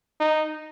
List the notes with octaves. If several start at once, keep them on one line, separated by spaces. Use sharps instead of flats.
D#4